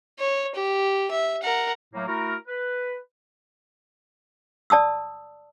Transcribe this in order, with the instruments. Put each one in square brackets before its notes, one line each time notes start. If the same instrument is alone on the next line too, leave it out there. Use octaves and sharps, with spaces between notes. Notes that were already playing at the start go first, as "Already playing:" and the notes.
[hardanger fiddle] C#5
G4
E5
A#4 F#5
[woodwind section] A2 F#3 A3 A#3
A3 E4 F#4 A#4
B4
[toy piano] D5 A5 D#6 E6